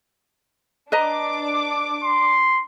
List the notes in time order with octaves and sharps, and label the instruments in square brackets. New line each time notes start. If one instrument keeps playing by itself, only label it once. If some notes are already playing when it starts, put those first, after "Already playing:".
[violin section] D4 D6 [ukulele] B4 D#5 A#5
[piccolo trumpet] C6